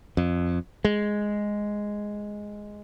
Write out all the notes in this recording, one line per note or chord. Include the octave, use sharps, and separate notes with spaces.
F2
G#3